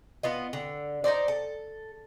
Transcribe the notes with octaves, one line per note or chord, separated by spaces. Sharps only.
B3 F4 D#5
D3
D#4 A#4 C5 D5
A4